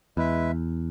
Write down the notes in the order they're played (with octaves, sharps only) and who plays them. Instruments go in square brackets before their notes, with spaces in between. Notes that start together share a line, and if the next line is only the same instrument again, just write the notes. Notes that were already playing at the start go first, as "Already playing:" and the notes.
[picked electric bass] E2 [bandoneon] G#3 E4 B4 E5